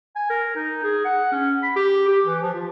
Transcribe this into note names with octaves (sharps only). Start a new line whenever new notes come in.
G#5
A#4
D#4
G#4
F#5
C#4
B5
G4
G4
E3
F3
F4